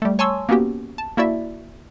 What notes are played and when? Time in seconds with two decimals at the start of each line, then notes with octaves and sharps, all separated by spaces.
0.02 G3 A3
0.19 C#5 G#5 A5 C6 C#6 E6
0.49 A#3 B3 C#4 F#4 G4
0.98 A5
1.17 A#3 E4 F#4 D5 E5